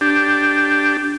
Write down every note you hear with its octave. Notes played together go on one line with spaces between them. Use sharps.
D4 G4